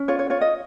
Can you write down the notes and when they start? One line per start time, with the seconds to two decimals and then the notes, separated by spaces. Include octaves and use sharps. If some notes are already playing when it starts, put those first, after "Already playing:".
Already playing: C#4
0.08 F4 C#5
0.19 C#5
0.30 F4 C#5
0.41 D#5